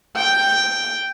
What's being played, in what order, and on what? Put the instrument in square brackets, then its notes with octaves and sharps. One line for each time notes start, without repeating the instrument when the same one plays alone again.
[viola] G5